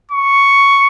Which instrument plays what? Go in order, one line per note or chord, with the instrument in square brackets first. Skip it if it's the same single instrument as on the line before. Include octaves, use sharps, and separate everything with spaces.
[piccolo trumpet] C#6